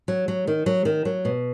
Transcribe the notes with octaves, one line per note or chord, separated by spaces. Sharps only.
F#3
F#3
D#3
F#3
D#3
F#3
B2